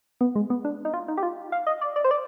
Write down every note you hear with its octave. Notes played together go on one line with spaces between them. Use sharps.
B3
G#3
B3
D4
D#4
F4
D#4
G4
F4
F5
D#5
D5
D5
C5
D5